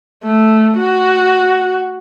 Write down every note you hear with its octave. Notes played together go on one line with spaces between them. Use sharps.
A3
F#4